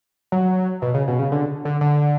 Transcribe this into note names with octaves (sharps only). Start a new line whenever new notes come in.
F#3
B2
C#3
B2
C#3
D3
D3
D3